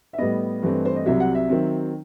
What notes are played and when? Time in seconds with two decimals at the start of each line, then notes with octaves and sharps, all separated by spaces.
0.13 E5
0.18 A2 G3 B3 D#5
0.62 G2 E3 A3 C4
0.85 C5
0.96 D#5
1.06 C2 C3 F#3 E5
1.20 F#5
1.35 E5
1.50 D#3 F#3 C4